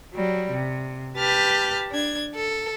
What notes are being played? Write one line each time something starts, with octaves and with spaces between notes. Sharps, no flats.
F#3 G3
C3
G4 B4 A5 F6 G6
D4 G#6
A4